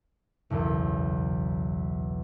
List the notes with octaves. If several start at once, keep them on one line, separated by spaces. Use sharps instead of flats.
F#1 B1 E2